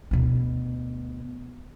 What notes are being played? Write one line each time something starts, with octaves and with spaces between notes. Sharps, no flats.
D2 B2